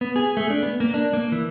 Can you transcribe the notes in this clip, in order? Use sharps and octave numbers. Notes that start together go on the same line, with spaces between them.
B3
G#4
A3
D4
B3
A#3
D4
A#3
E3